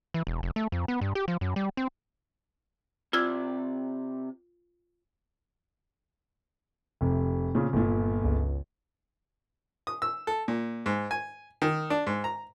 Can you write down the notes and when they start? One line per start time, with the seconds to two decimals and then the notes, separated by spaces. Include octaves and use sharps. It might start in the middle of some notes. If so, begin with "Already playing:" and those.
0.14 E3
0.27 E1
0.43 F1
0.56 A3
0.72 F2
0.88 B3
1.01 G2
1.15 G4
1.28 F3
1.41 F#2
1.56 G3
1.77 C4
3.13 C3 C4 F4 D5 E6 G#6
7.01 F1 C3
7.55 A#2 C#3
7.73 G1 A#2
8.23 C#2
9.87 D#6
10.02 E6
10.27 A4
10.48 A#2
10.86 G#2
11.11 G#5
11.62 D#3
11.90 D4
12.07 G#2
12.24 A#5